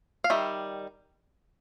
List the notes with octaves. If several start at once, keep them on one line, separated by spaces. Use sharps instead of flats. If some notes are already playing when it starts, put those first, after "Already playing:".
F5
D#3 G3 E5